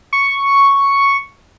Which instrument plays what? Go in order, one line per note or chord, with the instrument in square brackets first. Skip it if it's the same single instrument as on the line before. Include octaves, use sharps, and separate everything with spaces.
[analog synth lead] C#6